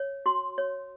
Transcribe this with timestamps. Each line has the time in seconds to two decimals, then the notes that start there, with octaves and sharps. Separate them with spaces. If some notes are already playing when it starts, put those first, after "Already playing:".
Already playing: C#5
0.26 F#4 C6
0.58 C#5